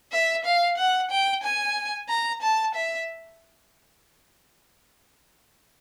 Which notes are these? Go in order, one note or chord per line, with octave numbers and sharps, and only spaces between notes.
E5
F5
F#5
G5
G#5
A#5
A5
E5